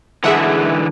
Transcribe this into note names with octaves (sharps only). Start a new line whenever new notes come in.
D3 E3 G#3 G#4 E5 F#5